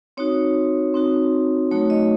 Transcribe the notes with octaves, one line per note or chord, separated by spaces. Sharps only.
C4 D#4 F#4 C#5
C4 D#4 F#4
F#3 A3 D#4 F#4 C#5
D#5